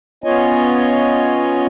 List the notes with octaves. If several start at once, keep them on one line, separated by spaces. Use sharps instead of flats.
B3 C#4 F4 C#5 D#5 G#5